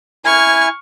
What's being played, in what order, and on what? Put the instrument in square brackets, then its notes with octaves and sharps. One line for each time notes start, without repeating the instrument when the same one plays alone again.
[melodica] E4 G#5 [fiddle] C#6 F6